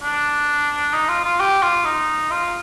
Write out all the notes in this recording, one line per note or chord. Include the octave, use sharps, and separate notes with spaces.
D4
D#4
F4
F4
G4
F4
D#4
F4